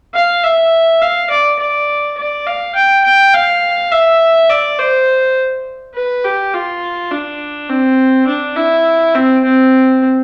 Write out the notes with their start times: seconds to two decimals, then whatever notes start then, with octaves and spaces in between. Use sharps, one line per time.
0.14 F5
0.44 E5
1.02 F5
1.30 D5
1.59 D5
2.18 D5
2.47 F5
2.75 G5
3.05 G5
3.34 F5
3.92 E5
4.50 D5
4.79 C5
5.95 B4
6.24 G4
6.54 F4
7.11 D4
7.69 C4
8.27 D4
8.57 E4
9.15 C4
9.44 C4